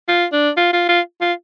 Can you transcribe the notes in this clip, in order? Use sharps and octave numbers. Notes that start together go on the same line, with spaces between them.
F4
D4
F4
F4
F4
F4